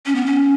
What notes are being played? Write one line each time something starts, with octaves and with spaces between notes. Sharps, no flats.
C#4
B3
C#4